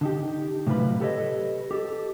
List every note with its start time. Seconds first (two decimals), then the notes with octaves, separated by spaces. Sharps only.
0.01 D3 D#4 G4
0.67 A2 C3 F#3 F4 B4 B5
1.00 G4 A4 B4 C#5 D#5
1.71 G4 A4